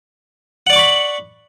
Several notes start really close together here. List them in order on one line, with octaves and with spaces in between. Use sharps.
F#5 D5 D6 C#6 B5